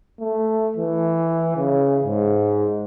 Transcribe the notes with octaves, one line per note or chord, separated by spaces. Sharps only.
A3
E3
C#3
G#2